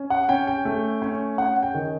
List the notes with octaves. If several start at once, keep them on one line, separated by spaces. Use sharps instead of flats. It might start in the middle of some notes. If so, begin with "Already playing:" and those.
Already playing: C#4
F#5
C#4 G5
G5
A3
C#4
C#4 F#5
G5
D#3